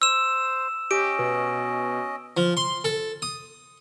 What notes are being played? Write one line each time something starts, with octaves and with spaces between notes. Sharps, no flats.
C5 E6 E7
C#4 G4 D#5 D7
B2
F3
C6
A4
D#6